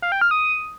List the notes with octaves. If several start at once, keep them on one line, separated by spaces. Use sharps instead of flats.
F5
G5
F6
D#6